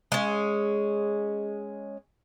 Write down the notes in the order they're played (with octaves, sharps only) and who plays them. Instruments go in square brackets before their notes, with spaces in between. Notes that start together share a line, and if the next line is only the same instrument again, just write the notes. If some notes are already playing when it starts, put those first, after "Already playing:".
[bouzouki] G#3 C#4